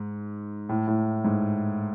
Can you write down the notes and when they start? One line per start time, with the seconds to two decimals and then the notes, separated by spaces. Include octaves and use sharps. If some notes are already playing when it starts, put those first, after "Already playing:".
Already playing: G#2
0.69 A2
0.88 A2
1.24 G#2